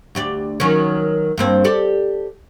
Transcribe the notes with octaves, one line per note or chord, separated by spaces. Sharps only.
D2 G4 D5
D#3 F#3 C#4
G2 A#3 C4
G4 A4 D5